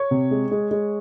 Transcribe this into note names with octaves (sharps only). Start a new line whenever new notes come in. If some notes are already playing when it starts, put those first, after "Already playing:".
Already playing: C#5
C3
G#3
G#3
G#3